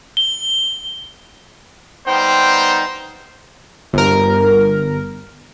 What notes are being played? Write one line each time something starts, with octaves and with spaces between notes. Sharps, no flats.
G7
G3 B3 D#4 C5 G5
G1 A#4